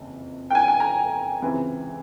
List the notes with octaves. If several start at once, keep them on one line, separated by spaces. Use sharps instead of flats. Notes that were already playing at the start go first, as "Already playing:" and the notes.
Already playing: F#1 F2 C3 E3
G5
G#5
G#5
A#5
C#2 C3 E3 G#3 C4